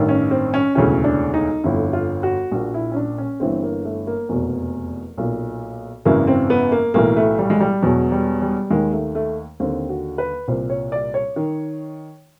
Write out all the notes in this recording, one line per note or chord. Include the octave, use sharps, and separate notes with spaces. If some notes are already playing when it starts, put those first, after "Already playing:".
Already playing: A1 G2 D#3
C#4
C4
C#4
E1 D2 C#3 E3 C#4
D4
D#4
G1 F2 D3 E4
F4
F#4
A#1 A#2 F#4
E4
C#4
D4
C#4
G1 G2 E3 C4
A#3
A3
A#3
F1 E2 B2
B1 A#2
G#1 F#2 C#3 E3 A#3
C4
B3
A#3
B1 A2 E3 A#3
A3
G3
G#3
G3
E1 E2 B2 F#3
G3
G3
D#2 D#3 G#3
A3
A3
D#2 D3 C4
F#4
B4
C2 A#2 C5
C#5
D5
C#5
D#3